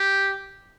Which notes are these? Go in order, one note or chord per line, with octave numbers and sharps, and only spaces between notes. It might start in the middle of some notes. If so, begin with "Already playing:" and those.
Already playing: G4